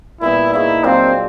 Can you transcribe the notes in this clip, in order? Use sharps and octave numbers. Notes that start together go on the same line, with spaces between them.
A#2 G3 B3 E4
A#3 D#4 E4 G#4 C#5
F#3 A#3 C4 D4 F4